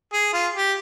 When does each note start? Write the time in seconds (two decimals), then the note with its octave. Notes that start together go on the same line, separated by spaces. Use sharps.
0.13 G#4
0.33 F4
0.55 G4